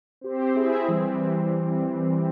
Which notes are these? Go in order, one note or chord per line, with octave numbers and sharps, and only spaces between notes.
C4 G4 C5
C4 E4 G#4 E5
E3 G3 C4